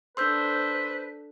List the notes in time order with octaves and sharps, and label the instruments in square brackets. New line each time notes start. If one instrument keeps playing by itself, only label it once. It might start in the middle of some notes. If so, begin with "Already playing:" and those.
[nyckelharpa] D4 A4 [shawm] B4 [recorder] C5 [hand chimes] C6 E6 G6